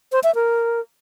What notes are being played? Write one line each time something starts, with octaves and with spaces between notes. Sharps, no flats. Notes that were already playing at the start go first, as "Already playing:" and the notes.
C5
E5
A#4